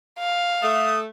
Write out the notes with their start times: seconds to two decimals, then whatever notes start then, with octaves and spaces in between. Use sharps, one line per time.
0.19 F5
0.62 A3 D#6